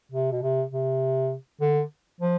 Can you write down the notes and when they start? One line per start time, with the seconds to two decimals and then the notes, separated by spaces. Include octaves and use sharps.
0.12 C3
0.32 B2
0.42 C3
0.72 C3
1.61 D3
2.21 F3